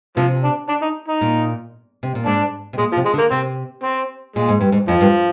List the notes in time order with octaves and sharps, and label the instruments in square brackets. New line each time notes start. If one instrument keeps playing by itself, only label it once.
[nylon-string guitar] C3 [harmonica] F3
[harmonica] D4
D4
D#4
D#4
[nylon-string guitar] A#2
C3
A#2
[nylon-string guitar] G#2 [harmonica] D4
[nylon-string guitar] C3
[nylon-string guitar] A#2 [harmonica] G#3
[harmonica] F3
[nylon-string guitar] C3
[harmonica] G#3
[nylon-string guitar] D3
[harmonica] A#3
[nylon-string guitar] C3 [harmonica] C4
[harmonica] C4
[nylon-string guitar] A#2 [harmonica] G#3
[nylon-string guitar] G#2
G2
G#2
[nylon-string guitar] F2 [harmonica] F3
[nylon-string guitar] G2